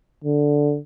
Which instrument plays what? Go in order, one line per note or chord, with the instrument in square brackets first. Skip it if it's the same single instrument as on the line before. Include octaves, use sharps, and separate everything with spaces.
[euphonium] D3